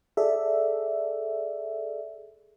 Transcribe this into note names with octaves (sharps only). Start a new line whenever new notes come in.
G#4 A4 D5 E5